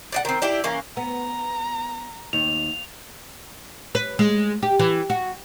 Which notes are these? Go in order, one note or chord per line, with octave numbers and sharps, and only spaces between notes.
D5 D#5 F#5
D#3 C4
D4 E4 G4
E3 A#3 C#4
B3 A#5
D#2 F7
B4
G#3
G4
E3
F#4